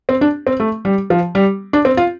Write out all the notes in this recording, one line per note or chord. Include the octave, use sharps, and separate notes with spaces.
C4
D4
C4
A3
G3
F3
G3
D4
C4
F4